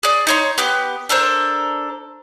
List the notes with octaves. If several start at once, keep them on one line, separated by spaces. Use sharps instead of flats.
G#4 D5
D#4 C#5 C6
B3 G4 F#6
D4 A4 A#4 C5